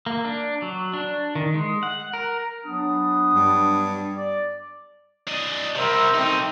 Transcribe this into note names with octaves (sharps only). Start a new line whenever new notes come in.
A#3
D4
F#3
D4
D#3
G#3
F#5
A#4
F#3 B3 D4 D#6
G2
D5
D4 D#5
C3 G3 A#4 C5 E5
B1 A3 C4 D#4